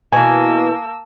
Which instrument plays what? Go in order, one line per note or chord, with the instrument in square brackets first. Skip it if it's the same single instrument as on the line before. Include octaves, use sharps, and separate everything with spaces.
[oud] B2 E3 [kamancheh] A#3 E6 [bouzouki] G#5 [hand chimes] A5